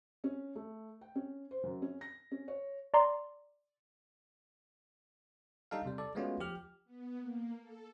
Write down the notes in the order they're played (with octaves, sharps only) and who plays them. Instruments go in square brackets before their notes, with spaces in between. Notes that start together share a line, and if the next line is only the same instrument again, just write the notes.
[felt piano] C#4
A3
G5
C#4
C5
F#2
C#4
A#6
C#4
C#5
[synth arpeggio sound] D5 A#5 C6
[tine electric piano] G3 D4 D#4 A4 F5
C3 G3
A4 D5
G#3 A3 B3 C#4 F4 F#4
F3 G4 F6
[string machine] B3
A#3
A4